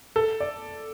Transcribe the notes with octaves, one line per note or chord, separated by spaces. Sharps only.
A4
D5